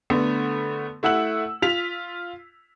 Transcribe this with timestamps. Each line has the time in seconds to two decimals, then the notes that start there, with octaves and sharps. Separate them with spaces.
0.10 D3 A3 B3
1.03 A3 E4 F#5 E6 F#7
1.62 F4 B6 F7